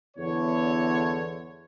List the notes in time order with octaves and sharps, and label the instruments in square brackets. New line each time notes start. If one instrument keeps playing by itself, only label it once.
[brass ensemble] E2 D3 C#5